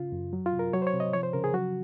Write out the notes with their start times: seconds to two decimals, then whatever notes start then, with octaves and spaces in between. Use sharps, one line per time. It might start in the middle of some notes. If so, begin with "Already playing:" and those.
Already playing: C#3 F4
0.12 F#2
0.33 F#3
0.46 F4
0.53 C3
0.59 A#4
0.73 F#3 C#5
0.82 C5
0.87 C#5
0.93 C3
1.00 D#5
1.13 F3 C#5
1.23 C5
1.33 C#3 A#4
1.44 G#4
1.53 F#3 F#4